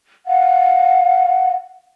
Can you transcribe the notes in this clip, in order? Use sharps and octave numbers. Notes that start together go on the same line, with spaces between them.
F5 F#5